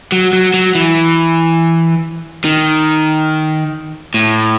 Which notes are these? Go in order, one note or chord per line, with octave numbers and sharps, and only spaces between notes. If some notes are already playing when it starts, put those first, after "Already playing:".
F#3
F#3
F#3
E3
D#3
A2